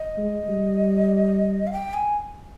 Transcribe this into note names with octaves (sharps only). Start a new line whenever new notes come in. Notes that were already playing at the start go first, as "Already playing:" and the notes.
Already playing: D#5
G#3
G3
F5
G5
G#5